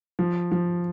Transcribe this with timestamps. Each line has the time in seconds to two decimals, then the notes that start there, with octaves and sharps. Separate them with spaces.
0.19 F3
0.52 F3